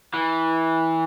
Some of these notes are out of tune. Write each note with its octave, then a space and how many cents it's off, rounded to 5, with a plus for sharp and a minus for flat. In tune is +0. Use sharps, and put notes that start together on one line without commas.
E3 -20